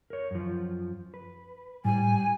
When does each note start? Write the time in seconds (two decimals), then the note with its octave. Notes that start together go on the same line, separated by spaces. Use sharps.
0.10 A#4 C#5
0.31 F#2 F3
1.14 B4
1.85 A2 G3 G4 G#5